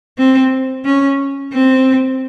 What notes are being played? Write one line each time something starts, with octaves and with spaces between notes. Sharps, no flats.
C4
C#4
C4